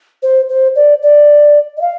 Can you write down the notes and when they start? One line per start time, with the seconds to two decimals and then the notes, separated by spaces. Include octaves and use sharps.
0.23 C5
0.49 C5
0.75 D5
1.03 D5
1.77 D#5
1.81 F5